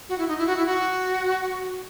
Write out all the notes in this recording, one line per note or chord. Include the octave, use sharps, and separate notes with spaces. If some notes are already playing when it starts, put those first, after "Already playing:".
F#4
E4
D#4
E4
F#4
E4
F#4